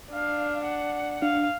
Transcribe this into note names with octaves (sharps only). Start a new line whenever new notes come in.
D4 F5
F#5
D4 F5